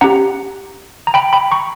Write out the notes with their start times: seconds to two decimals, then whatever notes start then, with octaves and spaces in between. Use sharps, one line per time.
0.01 C#4 G4 F#5 A#5
1.07 A#5
1.14 G5 B5
1.33 G5 B5
1.51 A#5 C#6